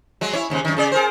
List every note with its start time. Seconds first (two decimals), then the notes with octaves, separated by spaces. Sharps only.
0.21 F#3 G#3
0.33 E4 C#5
0.50 D#2 G#2 C#3
0.65 F#2 D#3
0.77 C#3 G#4 D5
0.92 G#4 A#4 C5